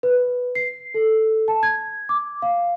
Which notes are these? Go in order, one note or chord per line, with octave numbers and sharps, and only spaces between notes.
B4
C7
A4
A5
G#6
D6
F5